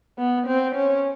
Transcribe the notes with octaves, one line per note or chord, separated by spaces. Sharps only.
B3
C4
C#4